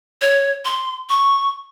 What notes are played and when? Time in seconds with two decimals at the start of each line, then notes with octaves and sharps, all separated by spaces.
0.21 C#5
0.65 C6
1.09 C#6